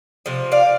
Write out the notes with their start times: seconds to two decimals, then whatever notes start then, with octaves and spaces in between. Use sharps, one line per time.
0.26 C3 F3
0.52 D5 F5